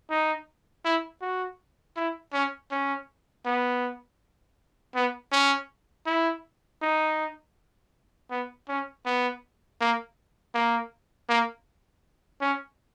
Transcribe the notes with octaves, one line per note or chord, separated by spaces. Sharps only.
D#4
E4
F#4
E4
C#4
C#4
B3
B3
C#4
E4
D#4
B3
C#4
B3
A#3
A#3
A#3
C#4